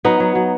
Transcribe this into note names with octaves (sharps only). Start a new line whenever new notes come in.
F#3 B3 D#4
F#3
F#3